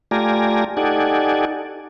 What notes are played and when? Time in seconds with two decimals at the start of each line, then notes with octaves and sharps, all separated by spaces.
0.11 A3 F4 G4 D5 G#5 A#5
0.77 D#4 G4 A4 D5 F#5 G#5